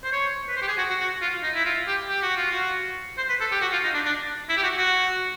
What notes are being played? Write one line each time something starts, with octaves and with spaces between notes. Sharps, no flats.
C5
C#5
B4
C5
G4
G#4
F#4
F#4
F#4
F4
D#4
E4
F4
G4
G4
F#4
F4
F#4
C5
B4
A4
G4
F#4
F4
D#4
D4
D4
E4
G4
F#4
F#4